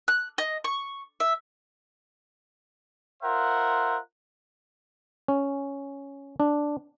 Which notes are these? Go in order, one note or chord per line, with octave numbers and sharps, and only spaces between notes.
F#6
D#5
C#6
E5
F4 A#4 C5 E5 F#5
C#4
D4